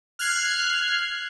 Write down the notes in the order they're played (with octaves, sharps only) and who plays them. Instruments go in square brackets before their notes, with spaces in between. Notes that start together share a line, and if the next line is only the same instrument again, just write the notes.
[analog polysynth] F6 F#6 G#6 C7